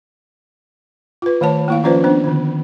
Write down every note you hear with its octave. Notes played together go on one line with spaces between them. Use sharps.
F4 B4
D#3 A3 C#5 A5
A#3 E4 F5
F3 C#4 F4 B4 C5 D5
B3 D4 C5
D3 D#3